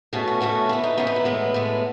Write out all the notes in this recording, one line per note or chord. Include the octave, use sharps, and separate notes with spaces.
B2 A3 C#4 G#4
F#4
B2 A3 C#4 F#4
E3 B3 E4
D#4
E3 B3 C#4
D#4
E4
A2 G#3 B3
A2 G#3 B3